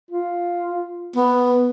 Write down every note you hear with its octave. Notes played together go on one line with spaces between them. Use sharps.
F4
B3 B4